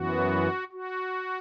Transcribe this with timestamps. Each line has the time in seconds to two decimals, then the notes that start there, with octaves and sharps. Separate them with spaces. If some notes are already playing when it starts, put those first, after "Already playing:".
Already playing: F#2 E3 B3 F#4
0.72 F#4